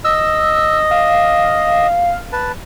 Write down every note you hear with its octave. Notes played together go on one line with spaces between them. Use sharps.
D#5 E6
F5
B4 A5